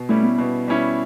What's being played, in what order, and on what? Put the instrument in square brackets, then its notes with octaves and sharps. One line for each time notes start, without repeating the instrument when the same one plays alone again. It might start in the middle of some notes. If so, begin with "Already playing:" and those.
Already playing: [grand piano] B2
[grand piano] G3 C#4 E4 [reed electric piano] A3
[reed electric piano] B3
[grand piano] B2
G3 C#4 E4